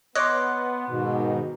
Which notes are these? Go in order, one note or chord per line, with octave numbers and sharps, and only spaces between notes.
B3 C#5 D#5 C6 D6 F#6
G#2 B2 D#3